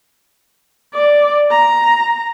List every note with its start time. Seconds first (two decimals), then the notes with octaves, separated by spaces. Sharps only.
0.94 D5
1.51 A#5